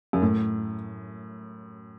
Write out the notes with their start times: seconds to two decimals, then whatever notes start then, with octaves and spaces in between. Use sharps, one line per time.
0.13 F#2
0.22 A2